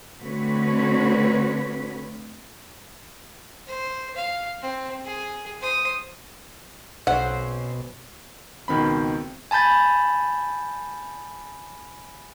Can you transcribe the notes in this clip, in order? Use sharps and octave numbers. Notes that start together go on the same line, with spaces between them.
D3 A3 C4 F#4 B4 C#5
C5
F5
C4
G#4
C5 D#6
B1 C4 C#4 C5 F#5
C#2 B2 D#3 C4 B5
G#5 A5 B5 G6 A6